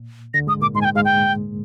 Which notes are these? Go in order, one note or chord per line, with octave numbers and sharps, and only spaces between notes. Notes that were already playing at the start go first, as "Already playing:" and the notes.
Already playing: A#2
D2 D3 A#6
G#2 G#3 D#6
A#2 A#3 D6
G#2 G#3 C6
G#5
G5
G#2 G#3 F5
G5